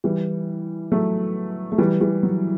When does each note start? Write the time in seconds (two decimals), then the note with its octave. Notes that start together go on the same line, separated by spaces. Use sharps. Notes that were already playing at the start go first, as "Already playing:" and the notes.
0.04 E3 G3
0.92 F#3 A3
1.72 A3
1.78 E3 G3
2.01 E3 G3
2.23 F#3